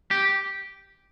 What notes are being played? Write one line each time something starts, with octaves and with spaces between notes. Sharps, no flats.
G4